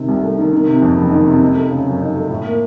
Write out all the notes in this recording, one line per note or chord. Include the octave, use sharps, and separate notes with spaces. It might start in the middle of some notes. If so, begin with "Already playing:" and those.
Already playing: C3 D#3
C2
A3
D#3
D#3
C3
F2
F#1
D#3
C3
D#4
A3
C#3
F#2
D#4
A3
A2
A#3